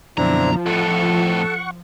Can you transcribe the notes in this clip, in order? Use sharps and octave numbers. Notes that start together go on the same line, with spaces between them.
F#2 B2 D3 F3 C4 D4 E4 A#5
F2 A2 A4 F#5 C#6